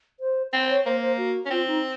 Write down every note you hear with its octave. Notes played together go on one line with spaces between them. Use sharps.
C5
C4 C5
C#5
A#3 C5
C5
F#4
C#4
C4 F4
D#4